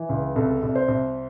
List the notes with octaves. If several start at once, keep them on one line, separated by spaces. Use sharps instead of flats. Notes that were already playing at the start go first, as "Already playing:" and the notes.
Already playing: E3
C#2
C2 A4
C2
C5
C2